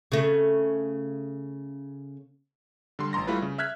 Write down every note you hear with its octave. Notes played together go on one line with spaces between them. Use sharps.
C#3 A3
D3 G3 C6
A1 A#5 C6 A#6
G3 A3 E4 F4 B4
C#3
E5 F6 F#6 G#6 B6